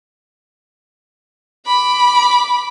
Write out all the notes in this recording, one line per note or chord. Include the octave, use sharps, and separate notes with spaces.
B5 D6